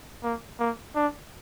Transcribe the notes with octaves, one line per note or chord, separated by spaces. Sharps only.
A#3
A#3
D4